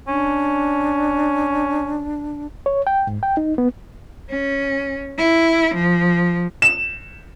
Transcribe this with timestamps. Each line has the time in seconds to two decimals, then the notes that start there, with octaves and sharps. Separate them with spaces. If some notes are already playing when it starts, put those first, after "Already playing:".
0.08 C#4 D4
2.66 C#5
2.87 G5
3.07 G#2
3.23 G5
3.37 D#4
3.58 B3
4.30 C#4
5.18 E4
5.74 F3
6.62 E7